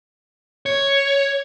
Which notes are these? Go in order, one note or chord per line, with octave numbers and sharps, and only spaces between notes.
C#5